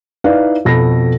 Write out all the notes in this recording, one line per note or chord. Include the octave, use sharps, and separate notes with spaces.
D#4 E4 B4 D5 F5
F2 B2 A4 B5 A#6